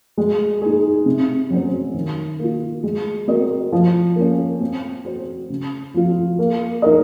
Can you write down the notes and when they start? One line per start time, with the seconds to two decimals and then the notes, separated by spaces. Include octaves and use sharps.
0.18 G#3
0.61 D#4 G#4
1.06 C3
1.50 F#3 C#4 F#4 C5
1.94 D#3
2.39 A#3 F4
2.83 G#3
3.28 C4 F#4 A#4 D#5
3.72 F3
4.16 A#3 C#4
4.61 C4
5.05 F#4 C5
5.50 C#3
5.94 F3 C4 F4
6.39 A#3
6.82 D#4 A#4 D#5